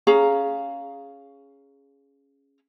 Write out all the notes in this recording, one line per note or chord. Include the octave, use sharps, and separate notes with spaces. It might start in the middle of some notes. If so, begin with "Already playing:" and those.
C#4 G#4 F5 A#5